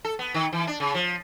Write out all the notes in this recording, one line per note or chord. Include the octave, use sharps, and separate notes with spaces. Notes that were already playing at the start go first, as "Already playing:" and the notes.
A4
B3
D#3
E3
D4
C#3
F3